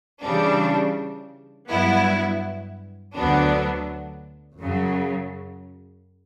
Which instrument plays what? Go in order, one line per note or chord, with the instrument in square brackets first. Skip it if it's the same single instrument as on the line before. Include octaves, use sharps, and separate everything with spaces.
[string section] C#3 E3 G3 D4
G2 F#3 B3 E4
D2 D3 F#3 B3 D4
F#2 C#3 F#3